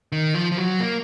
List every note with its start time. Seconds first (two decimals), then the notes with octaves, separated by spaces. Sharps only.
0.12 D#3
0.35 F3
0.52 F3
0.58 F#3
0.80 A#3